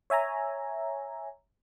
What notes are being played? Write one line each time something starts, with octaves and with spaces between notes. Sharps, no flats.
C#5 E5 G#5 A#5